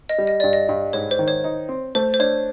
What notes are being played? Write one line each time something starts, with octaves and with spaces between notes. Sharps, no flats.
D#5
G3
D#5
G2 D5
D#5
G2
G#2 C#5
C5
D#3
C#5
D#4
C4
A3 C5
C5
D4 C#5